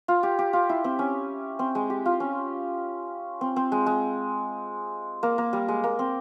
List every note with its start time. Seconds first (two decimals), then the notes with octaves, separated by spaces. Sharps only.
0.08 F4
0.23 G4
0.39 G4
0.53 F4
0.69 E4
0.84 C4
0.99 C#4
1.59 C4
1.75 G#3
1.90 G4
2.05 F4
2.20 C#4
3.41 C4
3.56 C4
3.72 G#3
3.86 G#3
5.23 A#3
5.38 A#3
5.53 G3
5.68 G#3
5.84 A#3
5.99 C4